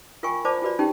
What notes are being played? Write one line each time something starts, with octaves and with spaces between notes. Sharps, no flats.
F4 A#4 G5 G#5 C#6
F4 C5 D5 A5 D6
F4 F#4 B4 D5
C#4 D#4 G4 G5